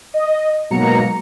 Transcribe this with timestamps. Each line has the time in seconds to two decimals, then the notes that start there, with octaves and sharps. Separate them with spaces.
0.14 D#5
0.70 G#2 B2 F#3 A#3 A#5 C#7